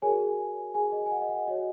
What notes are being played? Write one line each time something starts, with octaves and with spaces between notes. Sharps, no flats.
F#4 G#4 A#4 C#5 G#5
G#4 G#5
D#5
G#5
F#5
D#5
F#5
F#4 C#5 D#5